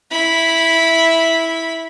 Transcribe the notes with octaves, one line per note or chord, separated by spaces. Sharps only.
E4 B5